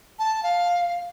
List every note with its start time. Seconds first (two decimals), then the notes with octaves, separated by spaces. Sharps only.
0.19 A5
0.43 F5